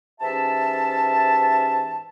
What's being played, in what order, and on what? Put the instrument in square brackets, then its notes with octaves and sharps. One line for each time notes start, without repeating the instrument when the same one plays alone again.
[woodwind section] G#2 E3 C#4 G4 E5 A5